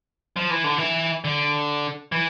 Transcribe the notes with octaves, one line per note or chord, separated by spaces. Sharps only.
F3
E3
D3
E3
D3
E3